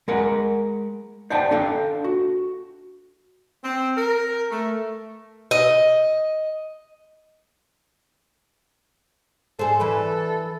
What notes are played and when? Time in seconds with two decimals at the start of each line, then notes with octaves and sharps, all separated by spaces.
0.08 G#3 A#4 F#5
1.30 C5 D5 F#5 G5 A5
1.51 D4 A4 F5 G5
2.04 F#4
3.62 C4
3.96 A#4
4.50 A3
5.51 D#5
9.59 G#4 A4 C5
9.80 E3 B4